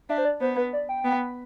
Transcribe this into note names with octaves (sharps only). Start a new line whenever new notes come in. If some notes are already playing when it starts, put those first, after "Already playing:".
D4 E5
C5
D5
B3 C5
B4
D5
G5
B3